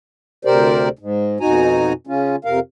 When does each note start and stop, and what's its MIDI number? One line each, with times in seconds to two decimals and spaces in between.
0.45 0.89 38
0.45 0.89 48
0.45 0.89 67
0.45 0.89 70
0.45 0.89 72
0.45 0.89 74
0.99 1.39 44
1.40 1.93 41
1.40 1.93 47
1.40 1.93 63
1.40 1.93 66
1.40 1.93 80
1.40 1.93 82
2.07 2.36 49
2.07 2.36 61
2.07 2.36 65
2.45 2.60 41
2.45 2.60 48
2.45 2.60 70
2.45 2.60 77